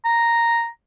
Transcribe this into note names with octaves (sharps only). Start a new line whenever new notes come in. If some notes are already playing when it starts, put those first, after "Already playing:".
A#5